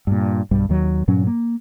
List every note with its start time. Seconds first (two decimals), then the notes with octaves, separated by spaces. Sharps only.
0.07 G2 A#2
0.51 B1 G2 G3
0.69 D#2 D#3 F#3
1.08 G2 A#2 F#3 C#4
1.27 A#3